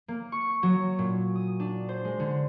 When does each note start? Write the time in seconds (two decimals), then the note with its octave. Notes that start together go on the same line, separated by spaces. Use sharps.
0.08 A#3
0.32 C#6
0.63 F#3
0.99 A#2
1.35 D#6
1.60 D4
1.89 C5
2.05 G#3
2.20 D3